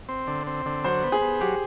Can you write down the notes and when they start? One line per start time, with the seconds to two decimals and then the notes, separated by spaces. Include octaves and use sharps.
0.09 C4
0.27 D3
0.47 C4
0.66 D3
0.85 F#3 C5
1.03 B3
1.12 G#4
1.22 B3
1.41 F#3 G4